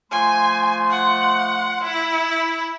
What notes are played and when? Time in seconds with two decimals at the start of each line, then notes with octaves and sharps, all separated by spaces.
0.12 F3 A3 G#5 C6
0.91 F#5
1.84 E4